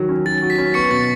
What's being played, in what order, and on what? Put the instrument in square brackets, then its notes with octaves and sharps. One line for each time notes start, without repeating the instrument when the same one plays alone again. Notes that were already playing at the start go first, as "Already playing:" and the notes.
Already playing: [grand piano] D#3 F#3
C#4
[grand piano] F#3 [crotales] A6
[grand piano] F#4
[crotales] B6
[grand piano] C#4
[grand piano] B3 [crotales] C#6 C#7
[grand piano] B2 [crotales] A6